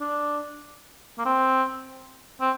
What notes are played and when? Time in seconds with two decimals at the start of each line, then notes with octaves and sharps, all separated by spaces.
0.01 D4
1.18 A#3
1.25 C4
2.41 C4